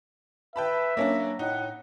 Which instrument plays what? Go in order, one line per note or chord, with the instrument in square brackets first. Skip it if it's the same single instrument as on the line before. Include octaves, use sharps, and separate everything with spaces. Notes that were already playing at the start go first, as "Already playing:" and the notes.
[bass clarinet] B4 [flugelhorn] E5 [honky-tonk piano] G5 A5 B5
[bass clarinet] F#3 [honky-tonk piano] A#3 C#4 D4
[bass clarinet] A2 [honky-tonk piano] D#4 [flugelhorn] F#5